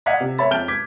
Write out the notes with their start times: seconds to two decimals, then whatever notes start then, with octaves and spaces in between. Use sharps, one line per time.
0.06 D5 D#5 F5 F#5 G#6 B6
0.20 C3
0.39 C#5 E5 B5 A6
0.51 F2 F6 G6 D7 G7
0.68 D6 G#6 B6